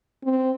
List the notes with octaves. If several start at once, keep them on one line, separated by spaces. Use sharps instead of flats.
C4